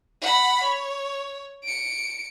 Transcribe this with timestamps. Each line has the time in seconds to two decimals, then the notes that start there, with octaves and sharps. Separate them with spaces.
0.22 F#5 B5
0.64 C#5
1.64 C#7 D7